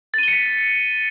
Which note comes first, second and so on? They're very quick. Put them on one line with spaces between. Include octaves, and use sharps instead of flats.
A6 D#7 G7 C#7 B6